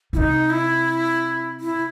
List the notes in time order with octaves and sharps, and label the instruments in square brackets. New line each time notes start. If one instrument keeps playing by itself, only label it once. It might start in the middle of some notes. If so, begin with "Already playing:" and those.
[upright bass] C3 [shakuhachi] E4
[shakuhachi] D#4
E4
E4